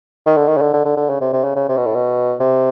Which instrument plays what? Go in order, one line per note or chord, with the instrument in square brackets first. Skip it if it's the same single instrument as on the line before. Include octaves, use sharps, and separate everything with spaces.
[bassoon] D#3
D3
D#3
C#3
D3
D3
D3
D3
C#3
C3
C3
C#3
C#3
C3
B2
A2
B2
C3